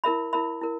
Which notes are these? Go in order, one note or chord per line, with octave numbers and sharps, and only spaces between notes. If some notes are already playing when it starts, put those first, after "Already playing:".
E4 A#4 E5 B5
E4 A#4 E5 B5
E4 A#4